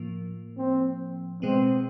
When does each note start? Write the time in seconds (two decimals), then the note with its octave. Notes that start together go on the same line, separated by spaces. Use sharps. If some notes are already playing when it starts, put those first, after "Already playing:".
Already playing: A2 F3 A#3
0.58 C4
1.42 B2 G#3 B3 C4